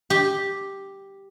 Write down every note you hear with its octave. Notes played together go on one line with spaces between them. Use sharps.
G4